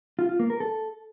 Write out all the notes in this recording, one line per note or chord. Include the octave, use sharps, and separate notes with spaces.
F4
F4
A#3
A#4
A4